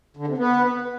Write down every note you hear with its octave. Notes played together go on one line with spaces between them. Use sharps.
D3
C3
B3